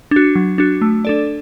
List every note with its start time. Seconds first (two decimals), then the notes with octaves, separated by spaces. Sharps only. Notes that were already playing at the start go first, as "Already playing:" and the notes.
0.11 D4 F#4
0.35 F#3
0.58 D4 F#4
0.82 A3
1.05 D4 A4 D5